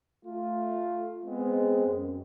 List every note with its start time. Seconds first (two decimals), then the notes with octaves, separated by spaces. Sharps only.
0.26 A3 F4
1.26 G#3 B3 C4
1.88 F#2